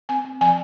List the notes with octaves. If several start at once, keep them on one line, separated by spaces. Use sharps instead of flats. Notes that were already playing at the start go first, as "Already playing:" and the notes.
C4 G#5
C4
F3 G#5